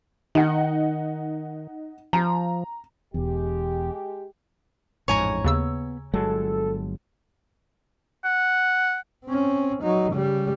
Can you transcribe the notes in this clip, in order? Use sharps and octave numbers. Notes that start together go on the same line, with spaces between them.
D#3 D#4 F#5
F3 A#5
E1 E2 G#3 G4
A1 F2 G#2 C#5 G#5 A#5
D#2 C#3 B3 E6
G1 F#3 G#3 A4
F#5
C4 C#4
F#3 D#4
C#3 G3